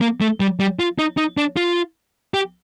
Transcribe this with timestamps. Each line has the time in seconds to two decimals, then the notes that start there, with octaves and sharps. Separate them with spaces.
0.01 A#3
0.21 A3
0.40 G3
0.60 G3
0.79 F4
0.99 D#4
1.17 D#4
1.37 D4
1.57 F4
2.34 G4